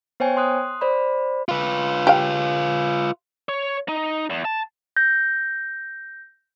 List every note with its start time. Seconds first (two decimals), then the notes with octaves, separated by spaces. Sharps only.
0.20 B3 C5 C#5 G5 G#5
0.37 C6 D#6 F#6
0.81 C5 D5 B5
1.49 F4 B4
2.07 G4 F5
3.49 C#5
3.89 D#4
4.30 E2
4.45 A5
4.97 G6 A#6